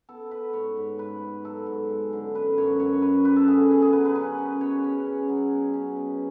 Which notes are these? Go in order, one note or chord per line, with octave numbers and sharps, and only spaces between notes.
B3 A4
B3 B4
G#2 C#5
G#2
G#2 B4
G#2
F#3 A4
G#2
G#3
D3
F#2 B4
F#2 C#5
F#2 C#5
F#2 B4
F#2 B4
A4
D3 G#4
B2 G#4
G#4
F#3 B4
B4
C#4
C#4
B2 C#5
C#4
C#4
F#3
B2
C#4
B2